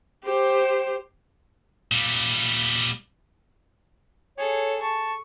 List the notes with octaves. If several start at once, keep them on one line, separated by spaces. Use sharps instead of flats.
G4 C5
A#2 G3
G#4 A4 C#5
A5 C#6